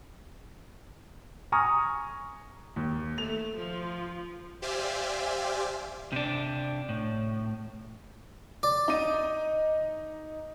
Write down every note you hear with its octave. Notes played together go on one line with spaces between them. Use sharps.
G#5 A#5 C#6 D#6 F6
D#2
A3 F7
F3
G4 C5 D5 E5 F5 G#5
C3 D4
A2
D5
D#4 D#5 D#7